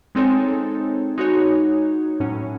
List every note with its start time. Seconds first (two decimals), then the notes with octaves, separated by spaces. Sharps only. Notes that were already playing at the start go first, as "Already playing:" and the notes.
0.15 G#3 C4 D#4 A4 C#5
1.18 G#3 D#4 F#4 C#5
2.20 A2 F#3 C#4